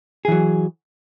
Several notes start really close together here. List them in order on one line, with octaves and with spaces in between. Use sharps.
G#4 E3 F#3